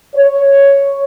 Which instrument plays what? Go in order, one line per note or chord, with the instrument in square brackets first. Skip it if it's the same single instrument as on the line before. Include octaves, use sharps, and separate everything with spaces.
[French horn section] C#5